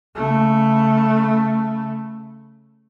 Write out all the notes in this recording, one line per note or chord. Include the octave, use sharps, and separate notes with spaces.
C#3 A3